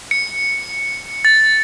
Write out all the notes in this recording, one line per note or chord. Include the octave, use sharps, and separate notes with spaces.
C#7
A6